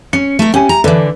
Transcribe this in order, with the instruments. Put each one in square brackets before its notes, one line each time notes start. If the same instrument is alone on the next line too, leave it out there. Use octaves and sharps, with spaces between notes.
[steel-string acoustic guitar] C#4 [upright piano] C#7
[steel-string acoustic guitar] A3 A#4
[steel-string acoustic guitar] C#4 [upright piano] G4 G#5
[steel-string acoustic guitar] A#5
[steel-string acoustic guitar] D3 E3 [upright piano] D4 A4 B4